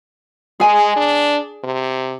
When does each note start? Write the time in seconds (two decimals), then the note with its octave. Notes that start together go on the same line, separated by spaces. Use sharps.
0.60 G#3 G#4 G#5
0.96 D4
1.64 C3